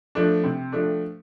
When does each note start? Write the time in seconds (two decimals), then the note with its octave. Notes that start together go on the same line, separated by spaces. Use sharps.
0.15 F3 A3 D4
0.44 C3
0.72 F3 A3 D4